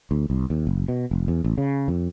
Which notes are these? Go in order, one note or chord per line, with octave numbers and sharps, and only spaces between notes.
D2
C2
D#2
F#1
B2
F1
E2
A1
C#3
F2